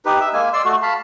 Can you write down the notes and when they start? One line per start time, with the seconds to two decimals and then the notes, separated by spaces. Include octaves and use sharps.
0.05 D#4 G4 B4
0.20 E5
0.33 G#3 A#3 G#5
0.53 D5 C6 E6
0.65 A3 F#4
0.82 F5 A5 B5